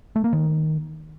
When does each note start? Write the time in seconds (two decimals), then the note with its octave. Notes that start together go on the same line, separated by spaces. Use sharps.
0.16 A3
0.24 A#3
0.33 D#3